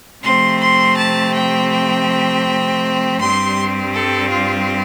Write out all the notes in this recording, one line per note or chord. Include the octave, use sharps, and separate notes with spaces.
C3 F3 A3 C4 C6
C6
A5
G5
G5
G2 G3 C4 C6
A4
F4